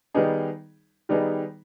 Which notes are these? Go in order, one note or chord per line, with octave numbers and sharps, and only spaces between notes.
D#3 G3 B3 D#4 G#4
D#3 G3 B3 D#4 G#4